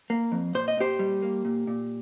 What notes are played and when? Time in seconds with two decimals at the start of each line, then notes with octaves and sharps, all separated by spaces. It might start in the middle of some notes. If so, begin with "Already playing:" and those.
0.10 A#3
0.32 F2
0.55 A#2 C5
0.68 D#5
0.77 A#2 G4 C5
0.99 G3
1.22 A#3
1.45 A#2
1.67 A#2